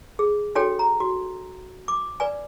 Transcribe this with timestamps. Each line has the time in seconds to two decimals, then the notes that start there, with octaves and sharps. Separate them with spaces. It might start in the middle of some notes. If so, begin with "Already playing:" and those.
0.19 G#4
0.55 D4 F#4 A4 C#5 G5
0.79 A#5
1.00 F#4
1.88 D6
2.20 B4 D5 G#5